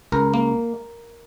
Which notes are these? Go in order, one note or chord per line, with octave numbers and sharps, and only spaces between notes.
C#2 A#4
A#3